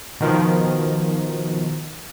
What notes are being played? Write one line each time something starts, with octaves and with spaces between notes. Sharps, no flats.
B2 D#3 F3